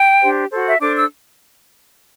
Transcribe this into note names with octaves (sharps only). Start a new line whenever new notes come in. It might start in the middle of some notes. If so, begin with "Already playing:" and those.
Already playing: G5
D4 G4 C5
F#4 A4 C5
E5
D4 A4 C5 D6
E6